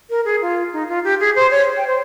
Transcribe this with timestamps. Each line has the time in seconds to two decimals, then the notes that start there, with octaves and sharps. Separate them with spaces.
0.10 A#4
0.25 G#4
0.42 F4
0.73 D#4
0.89 F4
1.04 G4
1.20 G#4
1.36 C5
1.51 C#5
1.77 G5
1.87 C5